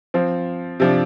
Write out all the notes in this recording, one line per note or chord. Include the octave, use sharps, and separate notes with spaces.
F3 C4
C3 F3 D4